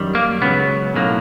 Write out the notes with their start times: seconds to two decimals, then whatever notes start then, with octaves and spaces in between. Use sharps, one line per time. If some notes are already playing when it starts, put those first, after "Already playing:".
Already playing: F#2 D#3 G3
0.15 A#3
0.41 C#2 C#3 F#3 B3
0.95 B1 A2 F#3 A#3